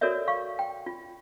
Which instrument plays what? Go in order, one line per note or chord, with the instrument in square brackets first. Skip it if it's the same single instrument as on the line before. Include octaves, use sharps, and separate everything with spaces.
[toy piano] F#4 A4 A#4 C#5 D5 E5
F5 C#6
G5
F4